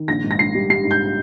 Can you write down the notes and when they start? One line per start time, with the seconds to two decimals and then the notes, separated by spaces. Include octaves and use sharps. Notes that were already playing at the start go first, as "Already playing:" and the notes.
Already playing: D#3
0.08 A#1 A#6
0.24 G#2
0.31 A#6
0.39 A#1 C7
0.55 G3
0.70 G3 C7
0.85 G#2
0.91 G6